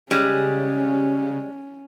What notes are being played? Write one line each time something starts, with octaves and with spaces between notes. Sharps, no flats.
C#3 G3 G#3 C#4 G4